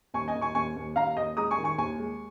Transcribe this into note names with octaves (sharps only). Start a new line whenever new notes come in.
D#2 G#5 C#6
D#5 G#5
D#2
G#5 C#6
D#2 G#5 C#6
D#2
D#2 F5 A#5
D#2 D#5
G#3 A#5 D#6
G#5 C#6
D#3
G#5 C#6
D#2 G#5 C#6
G#3